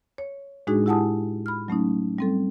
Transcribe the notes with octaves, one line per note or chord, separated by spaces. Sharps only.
C#5
A2 G#3 D4 D#4 F#4 G#4
E4 G4 F#5 G#5 A5 D#6
B5 F6
F#3 A3 C#4 D#4
G3 C4 A4